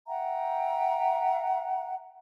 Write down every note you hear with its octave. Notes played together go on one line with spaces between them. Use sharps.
E5 F#5 G5 A#5